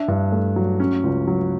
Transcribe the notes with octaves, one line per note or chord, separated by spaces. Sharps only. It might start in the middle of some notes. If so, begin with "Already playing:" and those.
Already playing: D4 E5
G2
A3
F#3
C#4
C#2
F#3